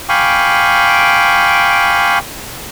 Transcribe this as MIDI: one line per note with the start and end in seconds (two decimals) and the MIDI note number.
0.09 2.19 77
0.09 2.19 79
0.09 2.19 80
0.09 2.19 83
0.09 2.19 85
0.09 2.19 86